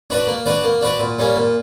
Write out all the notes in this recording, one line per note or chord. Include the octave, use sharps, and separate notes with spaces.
D4 F#4 B4 D5
A#3
D4 F#4 B4 D5
A#3
D4 F#4 B4 D5
A#2
G3 A#3 C#4
A#2